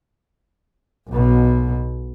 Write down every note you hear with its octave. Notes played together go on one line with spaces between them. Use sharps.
B1 B2